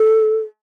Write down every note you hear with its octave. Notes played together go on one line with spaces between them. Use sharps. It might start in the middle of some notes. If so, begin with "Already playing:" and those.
Already playing: A4